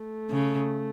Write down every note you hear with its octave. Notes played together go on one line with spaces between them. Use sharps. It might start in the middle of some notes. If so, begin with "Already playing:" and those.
Already playing: A3
C#3